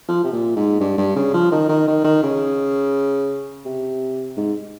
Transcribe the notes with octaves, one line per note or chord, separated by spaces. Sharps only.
F3
C3
A#2
G#2
G2
G2
C#3
F3
D#3
D#3
D#3
D#3
C#3
C3
G#2